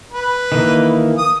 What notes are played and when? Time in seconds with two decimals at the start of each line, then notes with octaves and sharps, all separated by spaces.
0.13 B4
0.52 D#3 E3 A#3
1.18 D#6